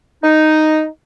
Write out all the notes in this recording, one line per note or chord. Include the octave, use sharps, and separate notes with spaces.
D#4